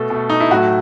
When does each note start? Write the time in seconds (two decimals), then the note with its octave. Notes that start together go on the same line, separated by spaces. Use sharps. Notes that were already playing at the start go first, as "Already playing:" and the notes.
Already playing: B2 A3 A4
0.10 B2 A3
0.30 D#4
0.40 E4
0.50 A2 F#3 A3 F#4